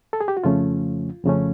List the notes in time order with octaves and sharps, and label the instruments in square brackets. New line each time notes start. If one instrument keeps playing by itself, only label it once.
[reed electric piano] A4
G#4
G4
F#4
F2 C#3 F3 A3 C#4 F4
F2 C#3 F3 A3 C#4